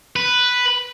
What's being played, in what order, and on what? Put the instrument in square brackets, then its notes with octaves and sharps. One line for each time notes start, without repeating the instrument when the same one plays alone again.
[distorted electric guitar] B4